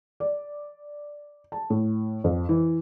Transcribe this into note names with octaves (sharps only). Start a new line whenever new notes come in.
D5
A5
A2
F2
E3